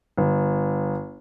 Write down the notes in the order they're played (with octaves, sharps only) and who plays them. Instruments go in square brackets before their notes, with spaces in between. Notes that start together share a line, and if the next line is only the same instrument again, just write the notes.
[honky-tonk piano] G1